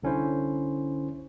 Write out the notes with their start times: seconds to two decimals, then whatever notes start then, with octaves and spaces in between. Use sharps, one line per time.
0.03 C2 D3 C#4 E4 C5